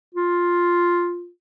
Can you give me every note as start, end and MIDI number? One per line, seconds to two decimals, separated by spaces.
0.15 1.29 65